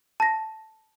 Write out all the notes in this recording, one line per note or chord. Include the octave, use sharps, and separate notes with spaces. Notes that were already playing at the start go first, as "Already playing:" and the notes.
A5 A#6